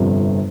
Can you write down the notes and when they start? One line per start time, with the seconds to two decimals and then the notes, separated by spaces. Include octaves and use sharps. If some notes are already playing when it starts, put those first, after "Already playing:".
Already playing: G1 F2 C3 F3